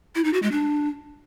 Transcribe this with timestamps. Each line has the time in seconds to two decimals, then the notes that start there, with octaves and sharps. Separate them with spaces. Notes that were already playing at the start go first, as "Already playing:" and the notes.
0.15 E4
0.24 D#4
0.33 F#4
0.43 G#3
0.52 D4